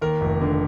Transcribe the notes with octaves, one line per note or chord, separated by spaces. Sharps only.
D#2 A#4
F1
D3